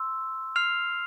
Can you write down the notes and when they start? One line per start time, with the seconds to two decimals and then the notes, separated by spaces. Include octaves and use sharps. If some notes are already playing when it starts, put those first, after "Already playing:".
Already playing: C6 E6
0.56 F6 C7 F7